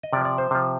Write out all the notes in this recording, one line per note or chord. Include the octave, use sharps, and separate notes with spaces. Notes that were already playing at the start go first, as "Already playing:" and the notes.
D#5
C3 F3 D5
D5
C5
C3 F3